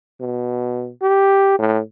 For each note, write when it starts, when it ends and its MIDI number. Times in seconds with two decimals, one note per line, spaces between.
0.21 0.90 47
1.02 1.54 67
1.59 1.80 45